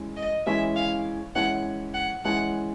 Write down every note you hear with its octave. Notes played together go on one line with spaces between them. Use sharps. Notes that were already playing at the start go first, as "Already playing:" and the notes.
Already playing: E3 G#3 C#4 E4
D#5
E3 G#3 C#4 E4 E5
F5
E3 G#3 C#4 E4 F#5
F#5
E3 G#3 C#4 E4 F#5